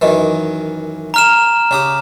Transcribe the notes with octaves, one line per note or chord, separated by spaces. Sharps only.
F#2 D#3 E3
A#5 F6 E7
C#3 G4 D#6